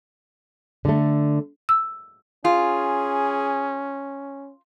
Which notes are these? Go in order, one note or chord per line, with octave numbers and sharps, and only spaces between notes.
D3 A3
E6
C#4 F4 G#4